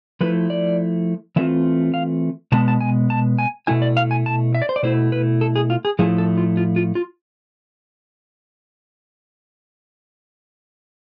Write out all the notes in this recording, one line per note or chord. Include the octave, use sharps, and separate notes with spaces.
F3 A3 E4 B4
D5
E3 A3 C4 F4 E5
F5
B2 G#3 B3 A5
A5
G#5
A5
G#5
B2 A3 E4 G#5
D5
F5
G#5
A5
E5
D5
C5
D5
B2 A3 E4 C5
B4
A4
G#4
F4
G#4
A2 F3 A3 E4 G#4
A4
F4
F4
F4
F4